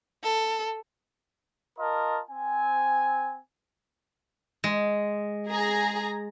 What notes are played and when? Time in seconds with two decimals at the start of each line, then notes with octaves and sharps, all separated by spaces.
0.23 A4
1.79 F4 A#4 D#5 A5
2.30 C4 G#5
4.64 G#3
5.49 G#4 A#5